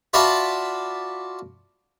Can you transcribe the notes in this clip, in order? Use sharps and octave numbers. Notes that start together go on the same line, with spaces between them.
F4 F#4 D5 E5 A5 B5